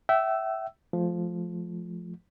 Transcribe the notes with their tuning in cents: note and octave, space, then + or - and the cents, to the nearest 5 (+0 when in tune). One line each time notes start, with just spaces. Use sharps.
E5 +0 G5 -40 E6 +0
F3 +0 A3 -30